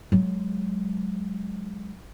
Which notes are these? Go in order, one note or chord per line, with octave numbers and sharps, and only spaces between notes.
F#3 G#3